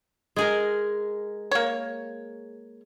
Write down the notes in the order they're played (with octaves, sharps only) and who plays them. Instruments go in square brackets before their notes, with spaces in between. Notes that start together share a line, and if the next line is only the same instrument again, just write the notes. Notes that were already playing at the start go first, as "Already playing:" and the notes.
[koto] G#3 G#4 A#4
[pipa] A#3 C#5